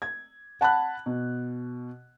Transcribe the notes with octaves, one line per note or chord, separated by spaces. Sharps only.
G#6
F#5 A5 B5 F#6
B2